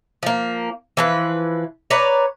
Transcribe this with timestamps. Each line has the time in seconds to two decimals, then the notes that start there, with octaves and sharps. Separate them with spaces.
0.23 F3 A#3
0.97 E3 F3 B4
1.90 B4 C#5 D5 A#5